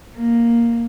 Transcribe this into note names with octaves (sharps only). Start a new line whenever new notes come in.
A#3